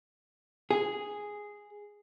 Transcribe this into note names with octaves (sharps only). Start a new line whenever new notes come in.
G#4